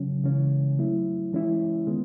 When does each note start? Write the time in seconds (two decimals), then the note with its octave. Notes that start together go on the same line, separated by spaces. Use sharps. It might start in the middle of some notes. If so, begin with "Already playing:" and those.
Already playing: C#3 F#3 C#4
0.24 C#3 E3 G#3 C#4
0.79 F#3 A3 E4
1.33 E3 G#3 C#4 E4
1.87 D#3 G#3 B3